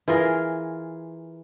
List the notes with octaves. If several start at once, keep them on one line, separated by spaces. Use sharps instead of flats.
E3 F4 G#4 A#4